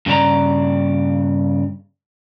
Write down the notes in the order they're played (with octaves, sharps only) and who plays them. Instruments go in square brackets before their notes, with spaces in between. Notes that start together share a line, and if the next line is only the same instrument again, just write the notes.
[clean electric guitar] G2 C#3 G#4 D5 A#5